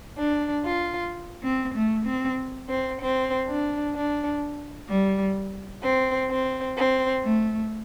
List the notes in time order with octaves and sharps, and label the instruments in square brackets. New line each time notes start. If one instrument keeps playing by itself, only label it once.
[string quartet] D4
F4
C4
A3
C4
C4
C4
D4
D4
G3
C4
C4
C4
A3